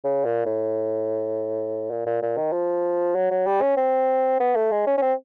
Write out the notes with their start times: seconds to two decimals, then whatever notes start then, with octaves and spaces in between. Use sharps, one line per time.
0.04 C#3
0.25 A#2
0.46 A2
1.91 A#2
2.06 A#2
2.22 A#2
2.37 D#3
2.52 F3
3.15 F#3
3.31 F#3
3.46 G3
3.62 C#4
3.77 C4
4.40 B3
4.55 A3
4.71 G#3
4.87 C#4
4.97 C#4
5.02 C4